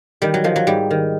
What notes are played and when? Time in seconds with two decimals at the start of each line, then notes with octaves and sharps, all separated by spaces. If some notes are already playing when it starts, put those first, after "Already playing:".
0.22 D#3 G3
0.34 F#3
0.44 D#3 F3
0.56 F#3
0.67 G#2 G3
0.91 D#3